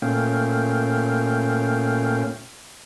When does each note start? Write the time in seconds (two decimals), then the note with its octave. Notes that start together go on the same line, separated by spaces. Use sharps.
0.02 A#2 A3 C#4 F5 G5